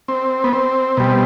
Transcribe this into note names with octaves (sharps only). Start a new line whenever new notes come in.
C4
B3
C4
B2 G3